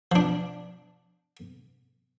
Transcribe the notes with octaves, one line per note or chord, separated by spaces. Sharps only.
F3 D4